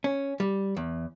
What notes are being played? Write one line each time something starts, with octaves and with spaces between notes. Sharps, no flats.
C#4
G3
E2